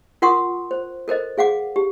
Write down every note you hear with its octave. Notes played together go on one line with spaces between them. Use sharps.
F4 A#4 F#5 C6 C#6 D#6
C5
A4 A#4 C5 D#5
G#4 F5 F#5 D6
G4